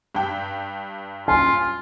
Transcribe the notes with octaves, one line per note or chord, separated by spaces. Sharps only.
G2 G5
F4 G#5